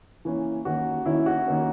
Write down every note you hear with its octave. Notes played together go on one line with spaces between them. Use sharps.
E3 A#3 C#4
D#3 A#3 C#4 F#4
D#3 A#3 C#4 E4
F#4
D#3 A#3 C#4